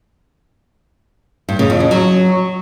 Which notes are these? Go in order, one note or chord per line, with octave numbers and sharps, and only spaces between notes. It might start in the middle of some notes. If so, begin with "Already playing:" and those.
G2
C#3
F2
C#3
F#3